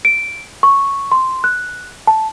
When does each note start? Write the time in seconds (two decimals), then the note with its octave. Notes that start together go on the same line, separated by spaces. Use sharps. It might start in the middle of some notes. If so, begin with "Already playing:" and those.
0.05 D7
0.63 C#6
1.12 C6
1.44 F#6
2.07 A5